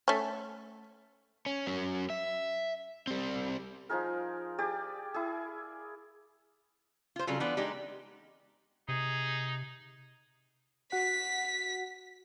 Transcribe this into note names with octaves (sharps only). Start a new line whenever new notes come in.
A3 C#4
C#4
F#3 C#4
E5
G3 C4
F3 D#4 G#4 A#4
G4 G#4 D5
E4 G#4
F4 C5
C#3 F#3 G3 C4 F4 A4
E3 B3 D4 F4
G#3 D4 D#4 G4
C3 D#4 G#4
F#4 F#5 B6